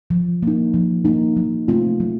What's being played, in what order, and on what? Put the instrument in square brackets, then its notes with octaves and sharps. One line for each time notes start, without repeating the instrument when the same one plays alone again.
[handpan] F3
A#3 D#4
F3
A#3 D#4
F#3
A3 C4 F4
F#3